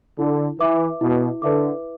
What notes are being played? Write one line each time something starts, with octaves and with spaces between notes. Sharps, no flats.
D3 E4
E3 B4 E5 D6
B2 E4
D3 B4 E5 D6